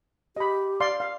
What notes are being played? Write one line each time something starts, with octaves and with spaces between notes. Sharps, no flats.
G4 D#5 B5
D5 F5 C6
F5